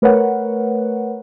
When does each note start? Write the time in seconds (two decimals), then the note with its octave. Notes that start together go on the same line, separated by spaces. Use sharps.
0.02 A3 A#4 B4 C#5 F#5